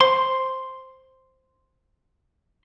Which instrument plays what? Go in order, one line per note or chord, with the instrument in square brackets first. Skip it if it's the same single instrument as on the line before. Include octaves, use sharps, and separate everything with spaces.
[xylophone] C5 [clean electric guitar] C6